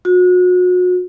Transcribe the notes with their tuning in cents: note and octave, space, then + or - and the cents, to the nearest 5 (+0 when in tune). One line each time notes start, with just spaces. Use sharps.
F#4 -35